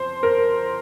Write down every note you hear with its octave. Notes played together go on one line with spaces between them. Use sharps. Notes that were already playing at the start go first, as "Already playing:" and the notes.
Already playing: F3 C5
A#4